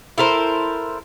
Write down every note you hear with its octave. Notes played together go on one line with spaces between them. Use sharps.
E4 A4 A#4 C5